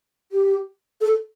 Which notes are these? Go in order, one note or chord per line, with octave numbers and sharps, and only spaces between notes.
G4
A4